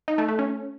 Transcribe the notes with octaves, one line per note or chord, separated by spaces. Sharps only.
D#4
A3
A3
C#4